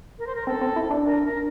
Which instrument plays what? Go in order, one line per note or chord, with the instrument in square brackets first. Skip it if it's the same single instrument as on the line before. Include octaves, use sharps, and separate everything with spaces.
[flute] A#4
C5
A#4
[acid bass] C4 [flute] A4
[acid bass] C4
E4
D4
[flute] A#4
A#4